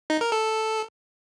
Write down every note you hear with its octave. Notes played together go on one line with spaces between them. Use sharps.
D#4
A#4
A4